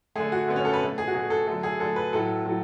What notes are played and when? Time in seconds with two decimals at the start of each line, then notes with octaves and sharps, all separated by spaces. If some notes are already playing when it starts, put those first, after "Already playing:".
0.16 D3 A3 G#4
0.32 F#4
0.48 D3 A3 B3
0.56 C#4
0.65 A4
0.73 B4
0.81 B2 A3
0.98 G#4
1.07 F#4
1.14 B2 A3 G#4
1.30 A4
1.47 D3 F#3 A3 A4
1.63 G#4
1.80 D3 F#3 A3 A4
1.96 B4
2.13 A2 F#3 A3 A4
2.46 A2 F#3